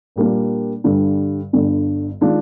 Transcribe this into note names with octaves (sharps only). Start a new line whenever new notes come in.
A#2 G3 A#3 D4
G2 D3 G3
G1 G2 D3
D#3 G#3 D4 F4